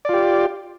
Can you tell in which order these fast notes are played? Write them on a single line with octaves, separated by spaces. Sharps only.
D5 F4 G4